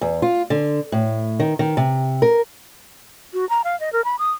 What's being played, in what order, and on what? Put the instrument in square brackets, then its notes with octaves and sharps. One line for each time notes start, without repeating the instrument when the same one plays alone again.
[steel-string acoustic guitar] E2
F4
D3
A2
D#3
D#3
C3
A#4
[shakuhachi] F#4
A#5
F5
D#5
A#4
B5
D#6